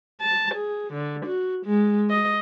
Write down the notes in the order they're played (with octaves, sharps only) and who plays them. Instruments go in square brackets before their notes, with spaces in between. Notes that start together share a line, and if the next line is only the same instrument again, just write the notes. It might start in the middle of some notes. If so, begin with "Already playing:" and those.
[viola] A5
G#4
D3
F#4
G#3
D#5